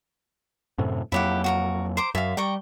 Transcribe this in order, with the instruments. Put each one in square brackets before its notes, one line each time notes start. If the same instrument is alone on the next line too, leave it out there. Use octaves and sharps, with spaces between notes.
[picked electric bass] F#2 A2 C3
[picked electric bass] F2 F#3 A#3 [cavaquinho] E4 G4 F#5
[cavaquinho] F#4 G4 A#4
C5 A#5 D6
[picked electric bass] F#2 [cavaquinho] E5 F5
[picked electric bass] G3 [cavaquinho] G5 A#5 C#6